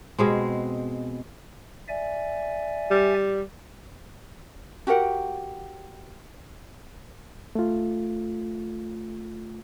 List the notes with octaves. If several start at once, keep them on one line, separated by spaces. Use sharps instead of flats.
B2 G#3 C4
D5 E5 G#5
G3
F#4 G4 A#4 F#5
A3 F4